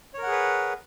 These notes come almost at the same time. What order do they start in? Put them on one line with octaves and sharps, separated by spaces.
C#5 A#4 F#5 G#4 B4